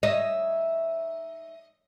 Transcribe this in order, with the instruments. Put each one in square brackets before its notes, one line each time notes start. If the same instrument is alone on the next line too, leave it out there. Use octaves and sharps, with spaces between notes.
[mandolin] D#4 C#5 E5 [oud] D#5